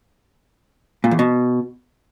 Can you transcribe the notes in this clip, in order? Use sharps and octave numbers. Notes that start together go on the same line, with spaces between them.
A#2
E2
B2